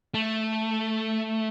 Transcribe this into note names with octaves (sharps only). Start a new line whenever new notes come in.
A3